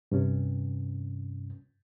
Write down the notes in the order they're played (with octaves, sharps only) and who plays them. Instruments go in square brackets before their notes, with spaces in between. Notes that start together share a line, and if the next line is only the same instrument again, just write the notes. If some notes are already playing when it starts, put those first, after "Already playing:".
[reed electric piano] G2 C3 C#4